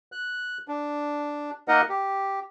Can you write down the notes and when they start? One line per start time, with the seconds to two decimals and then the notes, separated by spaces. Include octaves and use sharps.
0.12 F#6
0.68 D4
1.68 A#3 D#4 A#4 D#5 F#5
1.89 G4